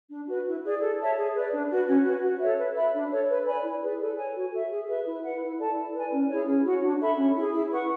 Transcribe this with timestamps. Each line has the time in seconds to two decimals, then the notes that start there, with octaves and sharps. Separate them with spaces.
0.11 D4
0.28 F#4 B4
0.46 E4
0.64 G#4 D5
0.81 A4
1.00 C#5 E5 A5
1.17 G#4
1.35 B4 D5
1.52 D4
1.70 F#4 B4
1.87 C#4
2.05 F#4 B4
2.23 F#4
2.40 A4 C#5 E5
2.58 B4
2.76 E5 B5
2.94 D4
3.11 A4 C#5
3.28 B4
3.47 D5 G#5 B5
3.64 E4
3.83 G#4 B4 D5
4.00 A4
4.17 C#5 G#5
4.35 F#4
4.53 A4 E5
4.70 G#4
4.89 B4 E5
5.05 E4
5.24 B4 F#5
5.41 E4
5.59 A4 D5 A5
5.77 E4
5.94 B4 D5 G#5
6.12 C#4
6.29 E4 G#4 C#5
6.47 C#4
6.65 F#4
6.70 C#5
6.83 D4
7.01 A4 E5 B5
7.18 C#4
7.36 E4 G#4
7.53 E4
7.72 B4 F#5 C#6